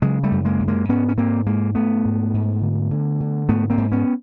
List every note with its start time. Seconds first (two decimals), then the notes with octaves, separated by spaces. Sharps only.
0.02 C#3 F#3 G#3
0.23 G3 A3
0.31 F#2
0.45 G#3 A#3
0.60 F#2
0.68 G#3 A#3
0.89 G#2 B3 C#4
1.09 C#4
1.17 G#2 A#3 C4
1.46 G#2 G#3 A#3
1.75 G#2 A3 B3
2.05 G#2
2.34 G#2
2.61 D3
2.91 D3
3.20 D3
3.49 G#2 A3 B3
3.70 A#3 C4
3.78 G#2
3.92 B3 C#4